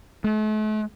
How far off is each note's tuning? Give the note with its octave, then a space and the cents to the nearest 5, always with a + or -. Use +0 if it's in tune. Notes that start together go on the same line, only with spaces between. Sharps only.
A3 -40